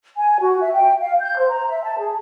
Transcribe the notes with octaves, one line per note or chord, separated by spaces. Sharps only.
G#5
F#4
E5
G5
F5
G6
C5
A#5
E5
A5
G#4